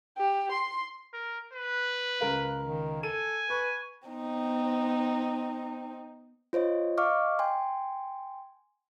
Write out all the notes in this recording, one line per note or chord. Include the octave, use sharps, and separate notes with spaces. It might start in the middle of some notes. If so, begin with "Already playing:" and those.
G4
C6
A#4
B4
C#2 A#4 F5
D#3
A4 G#5 D#7
B4 C#6
B3 C4 D#4
F4 C5 C#5 D#5
D#5 F5 C#6 D6 F6
G5 G#5 C6